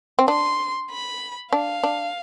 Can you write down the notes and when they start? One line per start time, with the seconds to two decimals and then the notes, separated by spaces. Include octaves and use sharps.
0.19 C4
0.28 D4 C6
0.91 B5
1.53 D4 F5
1.83 D4